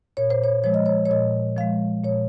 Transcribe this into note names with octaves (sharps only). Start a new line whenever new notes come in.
A#2 C#5
C5
C#5
F3 G#3 C#5
D#5
C#5
C#5
A#2 D#5
F3 G#3 F5
A#2 C#5